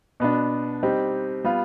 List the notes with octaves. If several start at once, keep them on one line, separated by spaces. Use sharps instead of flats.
B2 B3 D4
G3 C4 D#4 G4
G3 B3 F4